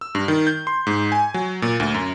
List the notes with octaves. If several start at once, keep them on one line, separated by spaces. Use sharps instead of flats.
E6
G2
D#3
G6
C6
G#2
G#5
F#3
A#2
D2
F#2